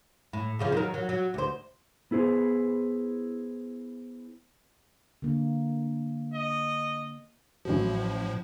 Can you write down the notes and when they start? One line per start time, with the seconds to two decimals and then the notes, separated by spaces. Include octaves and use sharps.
0.33 A2
0.59 E2 C#3 F3
0.72 D#3 F#3 A#4
0.94 F#3
1.09 F#3
1.34 D2 C5
2.11 B3 E4 G#4 C5
5.22 D3 A#3
6.34 D#5
7.65 A1 A2 F3 F#3